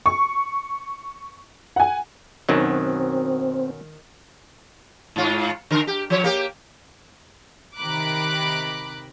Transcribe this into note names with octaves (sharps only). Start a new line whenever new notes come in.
C#6
F#5 G#5
F#2 B2 D#3 F#3 C4
G#2 F4
D3 A#4
G4
F3 C#5
A#3 G4
C3 D#3 A#5 B5 D6 F#6